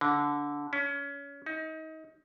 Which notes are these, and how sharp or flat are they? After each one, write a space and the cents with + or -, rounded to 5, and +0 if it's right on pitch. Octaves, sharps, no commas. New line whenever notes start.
D3 -15
C#4 +25
D#4 +30